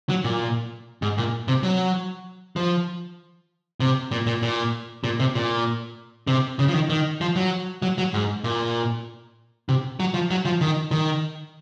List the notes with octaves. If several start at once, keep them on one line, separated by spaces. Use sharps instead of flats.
F#3
A#2
G#2
A#2
C3
F#3
F3
C3
A#2
A#2
A#2
A#2
C3
A#2
C3
C#3
F3
D#3
D#3
F3
F#3
F#3
F#3
G#2
A#2
C3
F#3
F3
F#3
F3
D#3
D#3